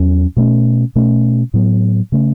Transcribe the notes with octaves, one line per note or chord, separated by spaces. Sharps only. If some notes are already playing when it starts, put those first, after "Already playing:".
Already playing: E2 F#3 C#4
B2 A3 C#4
B2 A3 C#4
A2 F#3 B3
C#3 A3 C#4